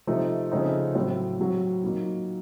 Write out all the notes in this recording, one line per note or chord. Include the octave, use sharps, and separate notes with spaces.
C3 F3 A3 D#4
C#3 F3 A3 C4 D#4
A2 F#3 C4
A2 F#3 C4 F#4
A#2 F#3 A#3 D#4